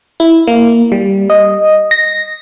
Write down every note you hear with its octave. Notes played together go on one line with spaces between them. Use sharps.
E4
A#3
G3
D#5
A#6